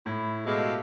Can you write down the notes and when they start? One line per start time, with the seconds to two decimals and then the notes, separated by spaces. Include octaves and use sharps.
0.06 A2 E4
0.46 B2 G#3 G4 A4 F5